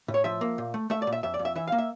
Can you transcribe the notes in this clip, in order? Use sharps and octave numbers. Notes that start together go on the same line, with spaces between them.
A2
C#5
F3 E5
A#3
A#2
A3
A3 E5
D5
A#2
E5
F2 E5
D5
F2
E5
E3 E5
A#3 F5
E5